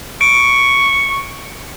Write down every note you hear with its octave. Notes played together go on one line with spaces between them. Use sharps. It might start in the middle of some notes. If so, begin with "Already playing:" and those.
C#6 D7